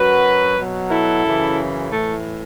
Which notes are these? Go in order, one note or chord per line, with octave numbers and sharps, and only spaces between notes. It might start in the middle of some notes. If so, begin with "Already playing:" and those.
Already playing: F#2 F#3 F#4 B4
B2 F#3
E4 A4
F#2 C#3 E3
A2 E3 A3